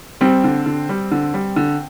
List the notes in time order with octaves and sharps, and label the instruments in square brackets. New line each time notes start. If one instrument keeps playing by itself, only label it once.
[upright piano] G3 [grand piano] C4
[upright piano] D3
D3
G3
D3
G3
D3